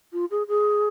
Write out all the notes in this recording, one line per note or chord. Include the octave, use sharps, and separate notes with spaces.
F4
G#4
G#4